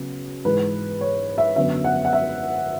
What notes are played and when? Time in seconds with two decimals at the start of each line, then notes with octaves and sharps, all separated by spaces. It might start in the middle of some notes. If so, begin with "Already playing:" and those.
Already playing: C#3 F#3 B3
0.45 G#2 E3 G#3 B4
1.01 C#5
1.38 E5
1.56 F#2 D3 F#3 B3 E5
1.84 F#5
2.05 F#5
2.13 E5